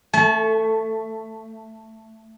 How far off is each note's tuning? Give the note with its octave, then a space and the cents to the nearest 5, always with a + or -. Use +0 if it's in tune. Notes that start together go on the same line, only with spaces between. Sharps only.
A3 +10 A5 -40